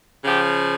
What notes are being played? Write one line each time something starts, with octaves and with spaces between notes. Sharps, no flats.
C#3 F3 G4